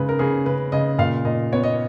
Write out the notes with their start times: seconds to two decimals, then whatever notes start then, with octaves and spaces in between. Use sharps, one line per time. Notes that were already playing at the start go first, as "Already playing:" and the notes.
Already playing: C#3 G#3 B4
0.09 A#4
0.19 C#3 G#4
0.46 C#3 B4
0.72 C#3 D#5
0.99 A#2 F5
1.25 A#2 D#5
1.53 B3 C#5
1.63 D#5